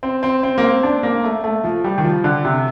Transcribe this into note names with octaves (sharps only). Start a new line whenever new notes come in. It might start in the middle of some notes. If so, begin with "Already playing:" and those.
C4
C4
C4
A#3
C4
D4
A#3
A3
A3
F3
G3
D#3
F3
D3
C3